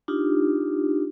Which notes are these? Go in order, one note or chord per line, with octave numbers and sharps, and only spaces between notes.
D4 D#4 F4 G4